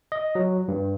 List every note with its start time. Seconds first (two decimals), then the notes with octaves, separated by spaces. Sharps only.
0.12 D#5
0.35 F#3
0.68 G2